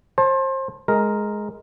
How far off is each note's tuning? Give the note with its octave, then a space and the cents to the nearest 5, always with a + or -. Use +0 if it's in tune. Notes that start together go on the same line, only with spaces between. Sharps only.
C5 +30 A5 +0
G#3 +10 A#4 +0